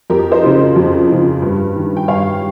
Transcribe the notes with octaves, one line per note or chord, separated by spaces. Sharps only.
F2 G4 A#4
C5 D#5
C#3 F3
F2
C#3 F3
G2
D#3
G5
G2 C#5 F5